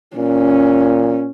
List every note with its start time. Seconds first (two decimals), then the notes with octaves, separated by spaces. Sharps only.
0.17 A#2 C#4